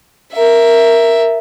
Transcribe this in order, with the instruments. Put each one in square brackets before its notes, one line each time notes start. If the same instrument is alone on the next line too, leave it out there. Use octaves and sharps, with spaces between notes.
[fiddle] A#4 E5